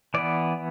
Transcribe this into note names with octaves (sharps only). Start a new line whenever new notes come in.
E3 B3 D5